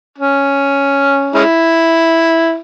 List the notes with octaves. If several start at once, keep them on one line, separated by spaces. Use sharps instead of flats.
C#4
G#3 C#4 E4